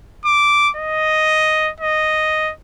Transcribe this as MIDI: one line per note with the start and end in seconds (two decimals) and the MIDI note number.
0.25 0.69 86
0.77 1.70 75
1.80 2.52 75